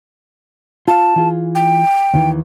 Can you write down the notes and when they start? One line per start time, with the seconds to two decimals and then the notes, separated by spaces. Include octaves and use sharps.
0.88 F4 F5 A5
1.16 E3 F4 G#4
1.55 G5
2.14 D#2 D#3 E3